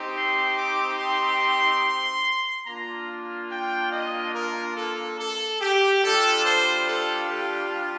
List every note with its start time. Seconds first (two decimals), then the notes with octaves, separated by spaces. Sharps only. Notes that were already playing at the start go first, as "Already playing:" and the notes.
Already playing: C4 D#4 G4
0.15 C6
0.57 D6
0.98 C6
2.66 A#3 D4 F4 A#5
3.51 G5
3.92 D#5
4.34 A#4
4.77 A4
5.19 A4
5.61 G4
6.03 G3 D4 F4 A4
6.44 C5
6.87 A4
7.28 G4